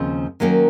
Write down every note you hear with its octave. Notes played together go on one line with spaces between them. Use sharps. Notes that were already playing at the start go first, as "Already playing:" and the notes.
Already playing: D#2 C#3 F3 C4
D#3 F#3 A#3 C#4